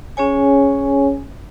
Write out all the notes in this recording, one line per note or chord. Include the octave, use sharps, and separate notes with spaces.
C#4 G#4 C#5 G#5